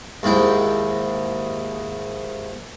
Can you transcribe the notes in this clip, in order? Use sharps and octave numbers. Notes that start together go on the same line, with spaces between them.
D#2 G#2 E4 G5